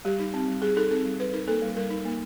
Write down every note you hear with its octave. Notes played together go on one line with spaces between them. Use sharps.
G3 G4
D#4
C4
G3
G3 G#4
D#4 A4
C4 A4
G3
G3 B4
D#4 A#4
A#3 A4
G3
G3 A#4
D#4
A#3